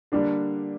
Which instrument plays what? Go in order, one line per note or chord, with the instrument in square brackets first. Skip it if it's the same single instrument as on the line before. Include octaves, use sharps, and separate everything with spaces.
[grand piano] D3 G3 A#3 [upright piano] D4